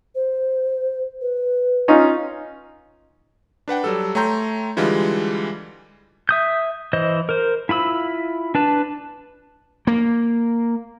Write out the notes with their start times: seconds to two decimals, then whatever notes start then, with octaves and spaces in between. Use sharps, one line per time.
0.15 C5
1.21 B4
1.88 C#4 D#4 F4
3.68 D4 B4 F#5 G5
3.84 F#3 G3 A4
4.15 A3 C#5 G5 A#5 C6 G6
4.77 D3 E3 G3 G#3 F4
6.29 E5 D#6 G6
6.93 E3 C5 D#5
7.29 A#4 C5
7.69 E4 F4 B5 E6
8.55 D4 B4 A5
9.87 A#3